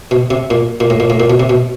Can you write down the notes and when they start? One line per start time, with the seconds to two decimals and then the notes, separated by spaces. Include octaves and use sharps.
0.11 B2
0.30 C3
0.50 A#2
0.80 A#2
0.90 A2
1.00 A#2
1.10 A2
1.20 A#2
1.30 B2
1.40 C3
1.49 B2